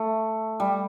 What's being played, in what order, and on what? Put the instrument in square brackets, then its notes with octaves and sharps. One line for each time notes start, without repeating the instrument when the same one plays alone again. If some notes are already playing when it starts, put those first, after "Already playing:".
Already playing: [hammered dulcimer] A3
G3